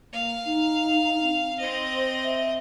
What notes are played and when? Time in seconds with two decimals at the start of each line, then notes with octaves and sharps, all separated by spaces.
0.13 A#3 F5
0.46 D#4
1.22 C4
1.59 C4 C5 D#5
2.24 E5